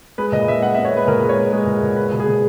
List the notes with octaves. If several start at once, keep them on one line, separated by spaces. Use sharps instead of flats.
G#3 B4
A#2 D#5
G#3 E5
B3 F#5
E5
B3
C#5
G#3 B4
A#2 A#4
G#3
C#5
B3
G#3
A#2
A#2
G#3 B4
B2
G#4
B2